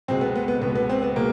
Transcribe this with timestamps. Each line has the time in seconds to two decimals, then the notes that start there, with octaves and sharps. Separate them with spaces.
0.08 C#2 B2 G#3 C4
0.21 B3
0.36 B3
0.48 B3
0.62 C#2 B2 G#3 B3
0.75 B3
0.89 C4
1.02 B3
1.16 B2 G#3 A#3